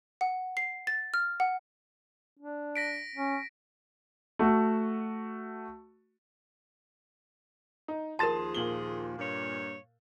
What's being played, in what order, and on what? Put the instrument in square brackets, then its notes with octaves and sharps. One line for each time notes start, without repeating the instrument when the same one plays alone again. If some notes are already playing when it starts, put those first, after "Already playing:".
[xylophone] F#5
C7
A6
F6
F#5
[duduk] D4
[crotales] A#6 B6 D7
[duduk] C#4
[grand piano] A3 F#4
[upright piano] D#4
[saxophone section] D#2 F3 G#4 [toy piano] A#4 A5 [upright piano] C6 A6 E7
[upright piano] A#2 F#7 G7
[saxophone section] G2 A#3 C#5